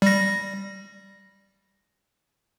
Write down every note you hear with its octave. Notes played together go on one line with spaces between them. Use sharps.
G3 A#6